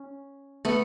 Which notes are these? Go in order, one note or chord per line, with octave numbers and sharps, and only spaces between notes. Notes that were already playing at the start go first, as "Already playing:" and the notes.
Already playing: C#4
A3 B3